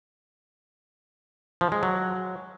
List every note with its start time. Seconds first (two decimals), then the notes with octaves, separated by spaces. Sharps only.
1.61 F3
1.72 G#3
1.83 F#3